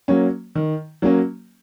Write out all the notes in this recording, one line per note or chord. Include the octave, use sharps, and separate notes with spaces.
F#3 A#3 C#4
D#3
F#3 A#3 C#4